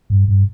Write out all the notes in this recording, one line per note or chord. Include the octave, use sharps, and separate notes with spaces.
G2
G2